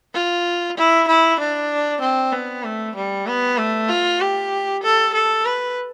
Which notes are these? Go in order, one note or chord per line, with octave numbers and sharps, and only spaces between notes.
F4
E4
E4
D4
C4
B3
A3
G3
B3
A3
F4
G4
A4
A4
B4